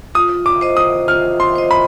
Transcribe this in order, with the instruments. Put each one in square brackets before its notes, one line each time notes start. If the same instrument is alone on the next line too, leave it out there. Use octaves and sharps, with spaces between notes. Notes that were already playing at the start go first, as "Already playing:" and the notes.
[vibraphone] F4 [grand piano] D#6
[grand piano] D6
[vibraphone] C5 D#5
[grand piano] D#6
[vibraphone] F4 [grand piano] F6
[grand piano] C6
[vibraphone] C5 D#5
[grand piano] B5